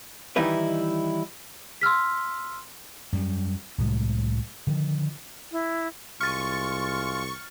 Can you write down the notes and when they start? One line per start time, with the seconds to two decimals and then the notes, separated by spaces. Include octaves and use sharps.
0.36 D#3 E3 G3 D#4 E4 B4
1.81 C6 E6 F6 B6
3.13 F#2 G3
3.78 C2 A2 F#3 G#3
4.67 D3 D#3 F3
5.52 E4
6.21 C2 G#3 F4 C#6 F6 A6